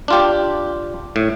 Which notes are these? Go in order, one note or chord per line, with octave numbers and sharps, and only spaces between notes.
D4 F4 G4
A2